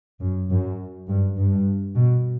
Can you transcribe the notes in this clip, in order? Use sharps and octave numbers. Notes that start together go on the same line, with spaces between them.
F#2
F#2
G2
G2
B2